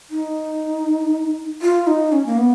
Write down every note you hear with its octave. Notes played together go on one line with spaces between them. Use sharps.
D#4
F4
D#4
C#4
A#3
B3